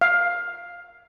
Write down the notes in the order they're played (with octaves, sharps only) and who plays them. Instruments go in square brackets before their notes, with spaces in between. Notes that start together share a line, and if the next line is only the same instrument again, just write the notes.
[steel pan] F5